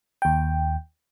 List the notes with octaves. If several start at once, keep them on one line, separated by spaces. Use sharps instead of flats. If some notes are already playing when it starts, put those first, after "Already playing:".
D#2 G5